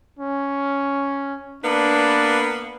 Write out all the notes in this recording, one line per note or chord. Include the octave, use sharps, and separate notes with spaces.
C#4
A#3 B3 D4 B4